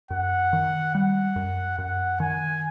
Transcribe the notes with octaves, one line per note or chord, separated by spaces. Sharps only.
F#2 F#5
D#3
G3 F#5
F#2
F#2 F#5
D#3 G#5